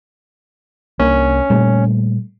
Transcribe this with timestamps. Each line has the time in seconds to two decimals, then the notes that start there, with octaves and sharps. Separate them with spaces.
1.00 C2 A#3 C#4 D4
1.50 A#2 G3 A3